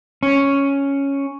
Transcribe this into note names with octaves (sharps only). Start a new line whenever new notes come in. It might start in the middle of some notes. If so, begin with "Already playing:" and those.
C#4